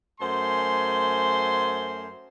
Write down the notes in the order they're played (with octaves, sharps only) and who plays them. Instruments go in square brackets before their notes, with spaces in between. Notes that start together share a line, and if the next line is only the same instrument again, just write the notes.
[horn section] F#2 A3 C5 G#5 C6